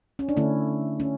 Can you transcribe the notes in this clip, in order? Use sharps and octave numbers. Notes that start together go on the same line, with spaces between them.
C#4
D4
D3 A3 C#4 E4
C#4